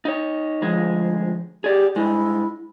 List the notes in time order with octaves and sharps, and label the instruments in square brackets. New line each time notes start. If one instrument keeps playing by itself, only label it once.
[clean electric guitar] D#4 C#5
[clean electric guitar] D2 G#3 G#4 [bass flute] F3
[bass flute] G4 [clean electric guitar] G#4 D5
[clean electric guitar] G2 G#3 [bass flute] E4